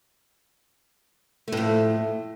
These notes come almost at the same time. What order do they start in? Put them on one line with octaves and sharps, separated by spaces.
A3 A2 F2